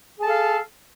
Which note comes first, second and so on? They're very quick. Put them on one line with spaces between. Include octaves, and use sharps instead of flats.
G#4 A5 A4 F5